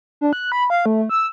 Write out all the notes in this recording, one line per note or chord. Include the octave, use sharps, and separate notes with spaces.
D4
F#6
B5
F5
A3
E6